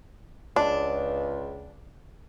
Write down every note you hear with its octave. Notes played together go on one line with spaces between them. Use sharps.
C#2 D4